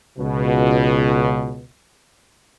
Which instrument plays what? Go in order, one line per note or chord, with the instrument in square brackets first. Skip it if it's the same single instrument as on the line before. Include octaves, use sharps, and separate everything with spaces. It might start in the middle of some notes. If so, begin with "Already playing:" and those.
[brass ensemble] C#2 B2